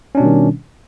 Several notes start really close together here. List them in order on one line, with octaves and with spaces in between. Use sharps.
C#4 D4 B2 G3 D#3